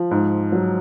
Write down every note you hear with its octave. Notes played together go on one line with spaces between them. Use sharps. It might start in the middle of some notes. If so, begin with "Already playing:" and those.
Already playing: F3
G#2
F#3